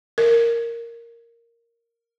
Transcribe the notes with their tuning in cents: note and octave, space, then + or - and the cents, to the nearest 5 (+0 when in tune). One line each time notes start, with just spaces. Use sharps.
A#4 -5